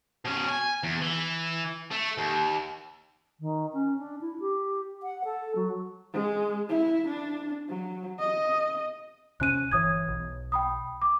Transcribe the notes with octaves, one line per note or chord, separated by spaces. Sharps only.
B2 C#4
G#5
E2
E3
A3
D#2
D#3
C#4
D4
E4
G4
F#5
A4
F#3
G#3
E4
D4
F#3
D#5
C#2 C3 C#4 F#6 D#7
G1 E3 C#5 D#6 G#6
B1
G5 B5 D#6
D6